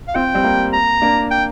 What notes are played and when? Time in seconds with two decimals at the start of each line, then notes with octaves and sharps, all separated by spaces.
0.08 F5
0.14 C4 F4 G5
0.34 G3 C4
0.44 A#3
0.73 A#5
1.02 A#3 D4
1.31 G5